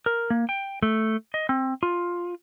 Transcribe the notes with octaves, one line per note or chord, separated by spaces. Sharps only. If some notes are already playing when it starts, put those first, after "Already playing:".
A#4
A#3
G5
A3
D#5
C4
F4